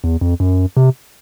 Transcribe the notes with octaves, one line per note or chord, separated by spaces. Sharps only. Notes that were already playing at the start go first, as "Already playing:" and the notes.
E2
F2
F#2
C3